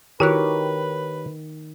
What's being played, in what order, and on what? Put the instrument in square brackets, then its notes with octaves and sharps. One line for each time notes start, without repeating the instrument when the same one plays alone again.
[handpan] D#3 [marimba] E4 F#4 F#6 [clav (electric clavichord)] G4 A#4 C#5 [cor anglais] B4